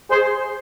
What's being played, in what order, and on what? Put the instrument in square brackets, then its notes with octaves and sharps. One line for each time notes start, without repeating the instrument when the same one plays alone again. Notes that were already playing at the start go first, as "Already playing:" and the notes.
[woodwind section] G#4 C5